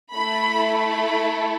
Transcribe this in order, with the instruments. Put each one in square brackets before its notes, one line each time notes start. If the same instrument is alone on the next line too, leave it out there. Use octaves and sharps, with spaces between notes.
[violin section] A3 E4 A4 B5
B5